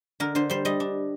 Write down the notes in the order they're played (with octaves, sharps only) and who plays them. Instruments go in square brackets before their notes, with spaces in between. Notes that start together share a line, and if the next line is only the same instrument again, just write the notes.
[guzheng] D3 A#4
D3 C5
G3 C5
G3 D#5
D4